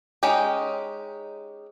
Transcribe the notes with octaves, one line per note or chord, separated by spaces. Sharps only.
G#3 C#4 D#4 G4